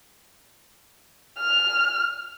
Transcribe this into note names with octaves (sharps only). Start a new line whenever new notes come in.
F6